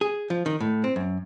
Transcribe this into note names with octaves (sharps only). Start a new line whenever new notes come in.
G#4
F3
D#3
A2
C4
F#2